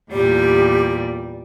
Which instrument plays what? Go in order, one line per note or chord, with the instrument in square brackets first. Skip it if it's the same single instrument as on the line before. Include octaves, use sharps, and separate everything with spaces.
[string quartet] E2 A#2 G3 [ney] G4